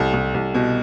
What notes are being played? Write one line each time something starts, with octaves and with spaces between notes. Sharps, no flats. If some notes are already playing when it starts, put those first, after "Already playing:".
Already playing: C2 A3
C2
C2
B2